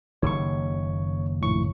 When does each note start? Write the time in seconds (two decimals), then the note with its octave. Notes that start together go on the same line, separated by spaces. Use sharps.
0.22 F#1 D#2 C#3 C#5 C#6
1.41 A#1 A2 C#6